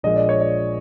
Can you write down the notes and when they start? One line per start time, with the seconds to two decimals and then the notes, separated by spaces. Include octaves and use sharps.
0.03 A#1 A#2 F3 G#3 D#5
0.16 D5
0.29 C#5
0.41 D5